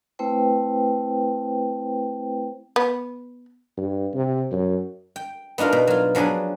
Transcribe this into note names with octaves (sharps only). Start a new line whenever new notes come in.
A3 C4 E4 B4 C5 G5
B3
G2
C3
F#2
G5
B3 D4 D#4 F4 A#4
B2
F#3 F4
F3 F#3 D4 G#4 B4